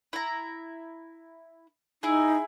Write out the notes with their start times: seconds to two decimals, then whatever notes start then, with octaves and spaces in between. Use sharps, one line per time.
0.13 E4 A#5
2.03 D#4 E4 G#4